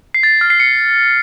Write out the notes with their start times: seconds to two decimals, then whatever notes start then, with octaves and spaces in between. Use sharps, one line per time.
0.14 C7
0.23 A6
0.41 F6
0.50 C7
0.60 C#7